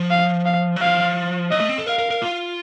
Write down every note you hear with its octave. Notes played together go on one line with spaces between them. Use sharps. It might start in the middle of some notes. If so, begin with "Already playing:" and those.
Already playing: F3
F5
F5
F#3
F3 F5
F#3 D#5
A3
C4
A4
A#4 F5
A#4
A#4
F4